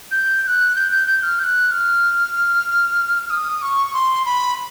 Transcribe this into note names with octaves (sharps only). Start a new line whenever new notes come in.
G6
G6
F#6
G6
G6
G6
F6
G6
F#6
F6
D#6
C#6
C6
B5